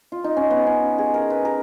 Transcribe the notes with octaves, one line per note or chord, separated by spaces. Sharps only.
F4
D#4
C#4
B3
C#4
G#4
A#4
B4
A#4